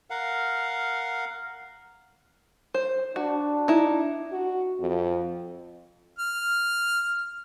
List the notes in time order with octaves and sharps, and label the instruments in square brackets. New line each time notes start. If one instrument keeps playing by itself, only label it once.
[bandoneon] A#4 F5 F#5
[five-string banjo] C5
[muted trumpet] D4 [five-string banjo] F#4
[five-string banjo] D#4 E4
[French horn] F#4
F2
[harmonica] F6